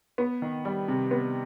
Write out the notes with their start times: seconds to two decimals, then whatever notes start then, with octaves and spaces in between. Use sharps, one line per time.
0.18 B3
0.42 D#3
0.65 G3
0.88 C3
1.11 B3